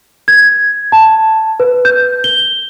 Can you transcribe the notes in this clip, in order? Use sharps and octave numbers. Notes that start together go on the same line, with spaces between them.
G#6
A5
B4
G6
G7